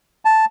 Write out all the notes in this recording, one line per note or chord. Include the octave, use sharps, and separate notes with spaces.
A5